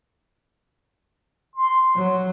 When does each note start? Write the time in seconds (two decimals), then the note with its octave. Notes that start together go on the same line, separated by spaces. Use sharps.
1.56 C6
1.96 F#3